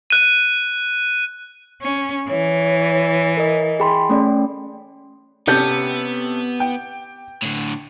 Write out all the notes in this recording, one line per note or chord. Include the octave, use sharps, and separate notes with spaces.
F#6 D#7
C#4
E3 C#5
A#4 D#5
G#4 G5 B5 C6
A3 C#4 D5
C3 B3 C#4 G4 A4 G6
G5
A2 D3